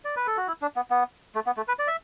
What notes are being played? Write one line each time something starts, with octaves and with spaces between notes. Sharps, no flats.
D5
B4
A4
F#4
E4
D4
B3
B3
A3
B3
A3
B4
D5
E5